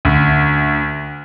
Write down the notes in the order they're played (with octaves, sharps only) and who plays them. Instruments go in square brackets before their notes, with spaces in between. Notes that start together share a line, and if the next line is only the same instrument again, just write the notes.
[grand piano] D2